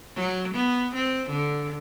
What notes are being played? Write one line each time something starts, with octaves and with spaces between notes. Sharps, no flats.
F#3
B3
C4
D3